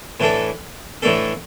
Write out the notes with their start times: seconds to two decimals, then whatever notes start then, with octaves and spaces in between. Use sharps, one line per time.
0.20 A2 E3 A3 D4 A4
1.02 A2 E3 A3 D4 A4